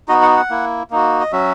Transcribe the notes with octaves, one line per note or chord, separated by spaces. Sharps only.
B3 D#4 F#4 D#5
F#5
F#5
A#3 E4
A#3 D#4 F#4
D#5
F#3 C#4 F#4 E5